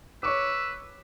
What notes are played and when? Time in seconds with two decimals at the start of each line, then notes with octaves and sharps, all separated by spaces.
0.23 B4 C#5 C#6 D6 E6